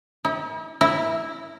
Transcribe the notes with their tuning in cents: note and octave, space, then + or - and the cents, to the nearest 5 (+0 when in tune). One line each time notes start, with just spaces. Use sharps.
E4 -40
E4 -5